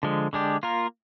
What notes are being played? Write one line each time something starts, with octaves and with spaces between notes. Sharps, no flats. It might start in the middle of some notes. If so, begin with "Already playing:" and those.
D3 F3 G#3
D3 G#3 D4 G4
A#3 F4 A#4